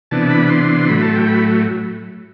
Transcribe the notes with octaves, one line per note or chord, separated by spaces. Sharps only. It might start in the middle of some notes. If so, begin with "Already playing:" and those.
C3 E3 B3 D4 A5
B5
C6
A2 F#3 A3 B5
A5
G5
B5